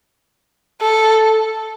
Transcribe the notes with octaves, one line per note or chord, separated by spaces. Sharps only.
A4